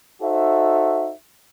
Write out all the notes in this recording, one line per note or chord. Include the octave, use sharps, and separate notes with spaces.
D#4 F#4 A4 C5 E5